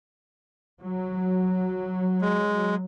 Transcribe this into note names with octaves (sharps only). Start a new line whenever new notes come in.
F#3
G#3